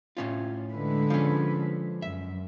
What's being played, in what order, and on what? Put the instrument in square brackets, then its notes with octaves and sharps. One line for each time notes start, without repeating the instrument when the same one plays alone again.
[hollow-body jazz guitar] A2 C#4 F4
[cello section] D3 G#3 B4
[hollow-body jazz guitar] F3 C#4
[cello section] F#2 [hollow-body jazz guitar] E5